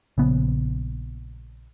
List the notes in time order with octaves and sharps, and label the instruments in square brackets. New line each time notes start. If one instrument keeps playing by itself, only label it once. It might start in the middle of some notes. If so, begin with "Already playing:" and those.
[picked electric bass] A#1 C#3 B3